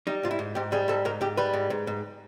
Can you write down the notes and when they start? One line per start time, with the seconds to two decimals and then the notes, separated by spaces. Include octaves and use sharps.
0.07 G3 D#4
0.23 G#2 F4
0.31 E4
0.39 G#2
0.55 G#2 G4
0.72 G3 G#4
0.88 G#2 A4
1.05 G#2 A#4
1.21 G#2 G4
1.37 G3 B4
1.53 G#2
1.70 G#2
1.87 G#2